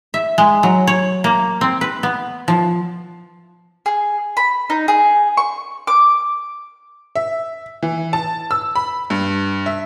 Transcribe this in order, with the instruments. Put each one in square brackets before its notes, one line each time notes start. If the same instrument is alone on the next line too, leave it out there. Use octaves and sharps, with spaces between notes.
[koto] E5
G#3
F#3
C#5
A#3
C4
B4
B3
F3
[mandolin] G#4
B5
D#4
G#4
C#6
D6
[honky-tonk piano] E5
E3
A5
E6
B5
G2
E5